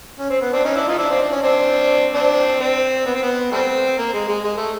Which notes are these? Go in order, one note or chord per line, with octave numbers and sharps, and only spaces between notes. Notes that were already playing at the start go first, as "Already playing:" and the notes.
C#4
C4
B3
C4 D4
C#4 D#4
D4 E4
D#4 F4
D4 E4
C4 D4
D4
C#4
C4 D4
C4 D4
C4
B3
C4
B3
G3 A3 C4
A#3
G#3
G#3
G#3
A3